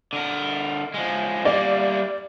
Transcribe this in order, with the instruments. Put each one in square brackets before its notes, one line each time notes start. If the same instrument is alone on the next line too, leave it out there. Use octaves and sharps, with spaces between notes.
[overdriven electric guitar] D3 A#4
F3 G#3
[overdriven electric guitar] G3 A#3 [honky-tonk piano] D5